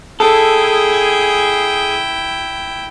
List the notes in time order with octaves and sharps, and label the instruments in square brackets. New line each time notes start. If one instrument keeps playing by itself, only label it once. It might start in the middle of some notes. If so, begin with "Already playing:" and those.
[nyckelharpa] E4 G5 [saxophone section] G#4 [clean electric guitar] A4